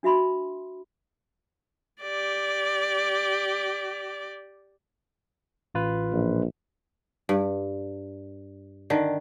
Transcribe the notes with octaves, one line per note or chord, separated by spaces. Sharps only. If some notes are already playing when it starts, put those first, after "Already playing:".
D4 F#4 E5 B5 C6
G4 D5
A1 F4 B4
A#1
G2
D3 D#3